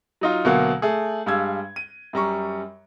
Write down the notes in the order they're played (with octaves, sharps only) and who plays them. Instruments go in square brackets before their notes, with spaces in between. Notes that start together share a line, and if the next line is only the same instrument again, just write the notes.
[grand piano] F#3 D#4 F4
D2 B2 F#3 A#3 F5 F#5
A3 G#4
G2 G3 G#3 F5 E6 G#6
D#7
F#2 G3 A#5 C#6